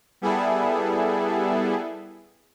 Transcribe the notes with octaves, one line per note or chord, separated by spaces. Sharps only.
G3 B3 E4 G#4 A4